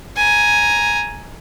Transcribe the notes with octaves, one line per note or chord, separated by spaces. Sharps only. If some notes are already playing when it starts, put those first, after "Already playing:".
G#5 A#5